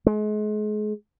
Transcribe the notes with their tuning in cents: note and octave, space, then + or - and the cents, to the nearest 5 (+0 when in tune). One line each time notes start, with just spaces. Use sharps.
G#3 +35